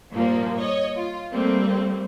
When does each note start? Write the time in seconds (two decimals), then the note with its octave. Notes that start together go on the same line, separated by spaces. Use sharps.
0.13 G2 A#2 F3 A#3
0.59 C#5 D#5
0.94 F4
1.33 G3 A3 A#3 C4